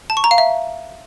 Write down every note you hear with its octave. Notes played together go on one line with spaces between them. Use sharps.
A5
C#6
A#5
F5
E5